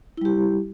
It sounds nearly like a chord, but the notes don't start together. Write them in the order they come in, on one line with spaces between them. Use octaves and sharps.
E4 G3 G4